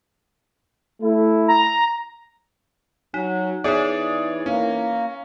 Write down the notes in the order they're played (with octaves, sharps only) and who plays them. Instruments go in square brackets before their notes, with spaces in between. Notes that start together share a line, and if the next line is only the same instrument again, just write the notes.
[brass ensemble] A3 E4
[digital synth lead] A#5
[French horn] F#3 [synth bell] D#4
[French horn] E3 [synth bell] B3 D#4 [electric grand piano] G#4 C#5 D5
[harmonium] A#3 [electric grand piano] C#4